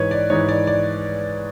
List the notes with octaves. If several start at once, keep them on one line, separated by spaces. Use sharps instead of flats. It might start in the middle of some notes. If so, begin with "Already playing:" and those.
Already playing: G#2 E3 B4 C#5
D5
G#2 E3 C#5
D5
D5